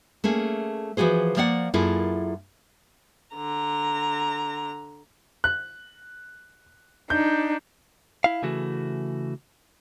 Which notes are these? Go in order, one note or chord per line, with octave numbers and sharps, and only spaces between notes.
A3 A#3 C#4 G#4
E3 F3 F#4 G#4 C5
F3 A#3 D5 F5 F#5
F#2 A#3 E4 F4 G#4 A4
D3 A#5
F#6
D4 D#4 G6
E4 F5
C#3 E3 A3 F#4